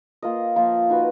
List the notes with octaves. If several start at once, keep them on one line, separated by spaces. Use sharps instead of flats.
A#3 F4 A#4 D#5
F3 A#3 F4
D#4 F#4 B4